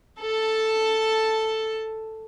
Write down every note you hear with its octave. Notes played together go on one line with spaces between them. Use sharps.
A4 A5